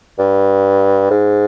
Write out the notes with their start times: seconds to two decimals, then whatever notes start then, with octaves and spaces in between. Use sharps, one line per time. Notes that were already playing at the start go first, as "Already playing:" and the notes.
0.19 G2
1.11 G#2